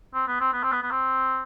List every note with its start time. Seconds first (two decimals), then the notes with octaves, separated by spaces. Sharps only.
0.14 C4
0.27 B3
0.40 C4
0.53 B3
0.63 C4
0.72 B3
0.82 B3
0.91 C4